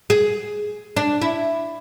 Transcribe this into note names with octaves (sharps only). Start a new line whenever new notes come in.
G#4
D4
E4